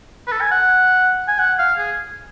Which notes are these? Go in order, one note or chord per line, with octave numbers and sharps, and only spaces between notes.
B4
A4
G#5
F#5
G#5
F#5
F5
G#4